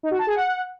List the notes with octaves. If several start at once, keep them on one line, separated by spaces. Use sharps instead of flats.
D#4
F#4
A5
G#4
F#5